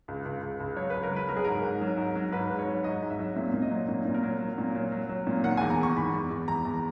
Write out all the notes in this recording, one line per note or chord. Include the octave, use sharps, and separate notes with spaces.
C#2
C#2
C#2
C#2
F#3 C#5
C#2 B4
A#4
F#3 B4
F#3 A#4
G#4
G#2 A#4
G#2
F#3
G#2
F#3
G#2 B4
G#2
C#5
F#3
G#2 D#5
G#2
E5
F#3
A#2 E5
A#2
D#5
F#3
A#2
A#2
A#4
F#3
F#3
A#2
F#3
F#3
F#3
A#2
D#3 F#5
E2 G#5
A#5
D#3 C#6
E2 B5
E2
E2
E2 A#5
E2
A#5